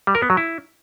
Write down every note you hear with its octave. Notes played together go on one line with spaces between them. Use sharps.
G3
A#4
B3
F#3
E4